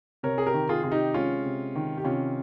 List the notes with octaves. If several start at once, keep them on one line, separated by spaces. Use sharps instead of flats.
C3 A#4 C#5
G#4
G4 A#4
D#3
F4 G#4
C3 F4
D#4 G4
G#3 C#4 F4
C3
D#3
G4
C3 C#4 F4